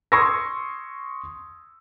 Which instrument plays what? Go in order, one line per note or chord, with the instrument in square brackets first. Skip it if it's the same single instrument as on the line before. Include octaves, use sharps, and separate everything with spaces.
[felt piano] C6 C#6 D#6 E6 G#6 A#6